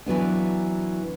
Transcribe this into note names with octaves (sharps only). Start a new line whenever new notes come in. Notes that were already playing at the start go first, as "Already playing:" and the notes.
E3 F#3 B3 D4